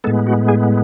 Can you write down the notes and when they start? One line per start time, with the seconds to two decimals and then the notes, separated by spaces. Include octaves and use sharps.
0.04 A2 G#3 B3 A4
0.27 F#4
0.48 G#4